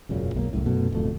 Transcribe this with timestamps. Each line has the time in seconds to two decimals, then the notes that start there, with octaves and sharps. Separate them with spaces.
0.09 E1 F#2 A#2 C#3
0.35 B1 G#3 A#3
0.53 C2 F#2 A2
0.66 F#2 B2 A3
0.92 D1 F2 A3